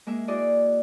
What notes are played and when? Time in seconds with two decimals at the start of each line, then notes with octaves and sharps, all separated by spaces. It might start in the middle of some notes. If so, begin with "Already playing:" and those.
0.07 G#3 A#3 G#4 E5
0.28 E4 F#4 G#4 D5 D#5